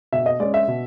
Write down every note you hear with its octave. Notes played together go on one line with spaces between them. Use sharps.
B2 E5
D#5
G#3 C#4 D5
E5
B2